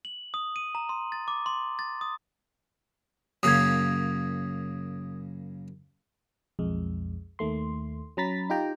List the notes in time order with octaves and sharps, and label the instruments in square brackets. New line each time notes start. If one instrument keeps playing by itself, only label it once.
[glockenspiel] F#7
D#6
D#7
A#5
C6
A6
D6
C6
A6
D#6
[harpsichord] F#2 C#3 A#3 [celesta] D#6 G#6
[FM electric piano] B1 F2 G#3
D#2 D#3 A3 C6
F#3 C#4 A#5 B5 A6 B6
D#4 F4 G4 G5 A#5